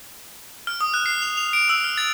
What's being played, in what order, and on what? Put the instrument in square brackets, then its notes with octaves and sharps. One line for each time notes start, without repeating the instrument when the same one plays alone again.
[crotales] F6
D#6
F#6
C7
F7
F7
D7
E6
F6
A6